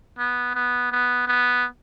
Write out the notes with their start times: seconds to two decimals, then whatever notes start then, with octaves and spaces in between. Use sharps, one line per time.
0.18 B3
0.55 B3
0.92 B3
1.28 B3